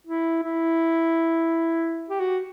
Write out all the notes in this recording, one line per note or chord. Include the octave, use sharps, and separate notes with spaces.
E4
E4
G4
F#4